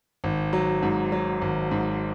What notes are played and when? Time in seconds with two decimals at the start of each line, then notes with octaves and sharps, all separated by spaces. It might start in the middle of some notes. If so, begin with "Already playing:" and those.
0.24 G#1
0.53 F#3
0.83 G#2
1.12 F#3
1.42 G#1
1.71 G#2